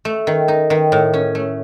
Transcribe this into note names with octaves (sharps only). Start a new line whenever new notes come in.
A3
D#3
D#4
D#3
A2
C#4
A3